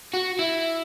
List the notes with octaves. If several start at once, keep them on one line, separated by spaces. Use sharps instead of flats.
F#4
E4